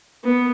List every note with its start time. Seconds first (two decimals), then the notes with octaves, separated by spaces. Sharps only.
0.24 B3